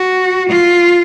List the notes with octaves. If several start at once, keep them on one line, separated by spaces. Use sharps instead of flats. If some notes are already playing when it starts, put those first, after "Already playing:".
Already playing: F#4
F4